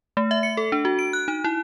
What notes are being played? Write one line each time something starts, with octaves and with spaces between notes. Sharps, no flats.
A3
E5
C#7
A4
D4
F#4
D7
F#6
D#4
E4